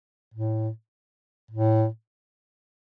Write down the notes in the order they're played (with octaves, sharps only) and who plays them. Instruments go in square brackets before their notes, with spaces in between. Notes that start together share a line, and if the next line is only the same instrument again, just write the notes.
[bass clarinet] A2
A2